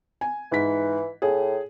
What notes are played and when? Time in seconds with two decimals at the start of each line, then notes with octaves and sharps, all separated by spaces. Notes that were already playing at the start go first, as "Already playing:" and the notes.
0.21 G#5
0.52 G#2 E3 B6
1.22 A2 G#4